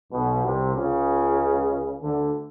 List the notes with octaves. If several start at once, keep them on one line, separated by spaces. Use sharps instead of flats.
B1 B2
C2 C3
C#2 C#3
D2 D3